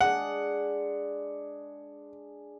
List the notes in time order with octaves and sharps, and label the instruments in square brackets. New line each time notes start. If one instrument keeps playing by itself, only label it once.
[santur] G#3 D4 G#4 [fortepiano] F#5